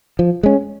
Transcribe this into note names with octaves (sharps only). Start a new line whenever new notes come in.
F3
G#3 C#4